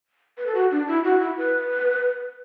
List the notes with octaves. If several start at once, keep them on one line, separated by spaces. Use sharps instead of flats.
B4
A4
F#4
D4
E4
F#4
E4
B4